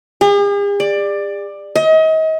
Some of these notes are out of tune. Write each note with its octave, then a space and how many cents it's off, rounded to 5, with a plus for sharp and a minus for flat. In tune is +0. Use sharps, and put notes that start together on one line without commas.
G#4 -45
D5 +15
D#5 +35